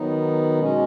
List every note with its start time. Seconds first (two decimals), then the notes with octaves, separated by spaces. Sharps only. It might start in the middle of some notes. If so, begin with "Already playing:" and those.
Already playing: D#3 F#3 B3 D#4
0.59 B2 G#3 C#4